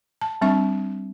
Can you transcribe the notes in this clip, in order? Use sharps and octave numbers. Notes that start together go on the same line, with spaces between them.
A5
G3 C4 D4 E5 C#6